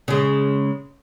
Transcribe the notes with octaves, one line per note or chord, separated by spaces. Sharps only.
C#3 G#3